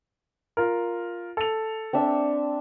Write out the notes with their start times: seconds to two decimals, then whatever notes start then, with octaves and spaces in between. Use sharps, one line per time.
0.57 F4 A#4
1.37 A4 F7
1.93 C4 D4 E5